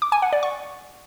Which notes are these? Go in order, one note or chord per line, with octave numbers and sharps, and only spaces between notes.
D6
G#5
F#5
D5
C#6